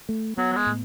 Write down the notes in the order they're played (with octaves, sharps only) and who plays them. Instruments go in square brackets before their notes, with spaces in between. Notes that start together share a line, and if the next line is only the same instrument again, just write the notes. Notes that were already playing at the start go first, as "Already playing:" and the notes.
[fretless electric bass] A3
[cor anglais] F#3 [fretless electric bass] B3
[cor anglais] F#3
G#3
[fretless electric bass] A2